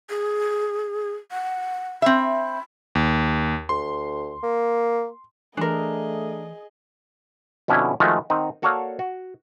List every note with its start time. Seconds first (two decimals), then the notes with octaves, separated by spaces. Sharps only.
0.10 G#4
1.31 F#5
2.02 C4 E5 B5
2.95 D#2
3.69 D2 C6
4.43 A#3
5.57 E3 A3 D4 G#4 A#4 D#5
7.68 F2 B2 D3 C#4 D4 E4
8.00 D#3 F3 G#3 A3 F4 F#4
8.30 D#3 C4 D#4 F#5
8.62 A#3 F#4 A4 C#5 D5 F5
8.99 F#4